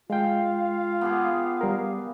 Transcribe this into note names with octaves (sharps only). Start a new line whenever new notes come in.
G#3 F4 F5 G5
B3 G4 G#4
G3 A#4